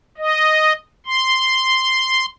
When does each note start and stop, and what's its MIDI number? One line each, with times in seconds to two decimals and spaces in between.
0.18 0.73 75
1.06 2.26 84